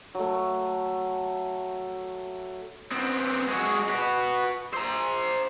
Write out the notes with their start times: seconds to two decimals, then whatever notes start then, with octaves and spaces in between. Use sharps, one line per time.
0.15 F#3 A3
2.92 B3 C4
3.48 G#3 F#4
3.89 F#4 B4
4.73 C5 A#5